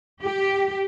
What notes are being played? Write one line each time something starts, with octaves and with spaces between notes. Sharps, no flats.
G4